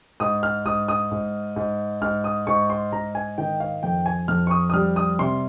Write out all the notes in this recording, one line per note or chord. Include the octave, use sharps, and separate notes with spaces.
G#2 D#6
F6
G#2 D#6
D#6
G#2
G#2
G#2 F6
D#6
G#2 C#6
C6
G#2 A#5
G#5
D#3 G5
F5
F2 G5
G#5
F2 F6
C#6
D#6
D#6
G3 F6
D#6
C3 C6